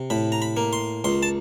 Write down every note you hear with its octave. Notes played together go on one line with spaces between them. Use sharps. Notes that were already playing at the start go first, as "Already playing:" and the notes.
Already playing: C3
A2 B5
A#5
B5
A#3
C6
C#2 C6
A5